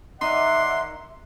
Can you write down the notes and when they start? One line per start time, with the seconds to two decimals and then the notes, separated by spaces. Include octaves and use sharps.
0.21 D#3 D#4 D5 E5 F#5 C6